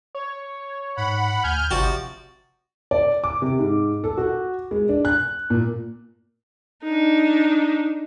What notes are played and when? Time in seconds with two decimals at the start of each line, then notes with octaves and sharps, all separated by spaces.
0.15 C#5
0.97 G#2 F#5 B5
1.44 D2 G#5 F6 G6
1.71 G1 C3 F3 F#4 D5
2.91 D5
3.24 D6
3.42 C3
3.59 G#2
4.04 A4
4.17 F#4
4.71 G#3
4.89 D4
5.05 F#6
5.50 A#2
6.83 D4 D#4